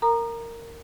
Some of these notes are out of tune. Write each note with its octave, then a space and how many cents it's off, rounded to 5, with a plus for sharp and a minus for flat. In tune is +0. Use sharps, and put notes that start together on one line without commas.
A#4 -15 A#5 +0 D#6 -40